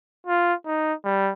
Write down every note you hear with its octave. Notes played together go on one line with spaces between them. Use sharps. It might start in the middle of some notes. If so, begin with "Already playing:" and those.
F4
D#4
G3